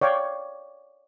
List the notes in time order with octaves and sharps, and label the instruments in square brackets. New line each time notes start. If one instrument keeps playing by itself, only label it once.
[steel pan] C#5 D5 F5 G5